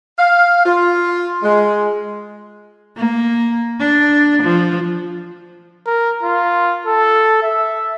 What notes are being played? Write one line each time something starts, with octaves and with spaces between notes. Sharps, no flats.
F5
F4
G#3
A#3
D4
F3
A#4
F4
A4
E5